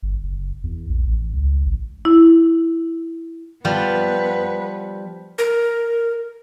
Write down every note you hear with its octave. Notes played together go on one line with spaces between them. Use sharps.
G1
F#1
E2
A#1
A1
C#2
A1
E4
F3 G3 B3 B4
A#4